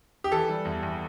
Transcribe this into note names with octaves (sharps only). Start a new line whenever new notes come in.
G4
E3 A4
G3
E2
E2